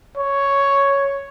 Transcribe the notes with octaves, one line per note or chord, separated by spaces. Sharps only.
C#5